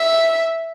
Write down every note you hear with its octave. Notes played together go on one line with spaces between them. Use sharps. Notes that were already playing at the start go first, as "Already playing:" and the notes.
Already playing: E5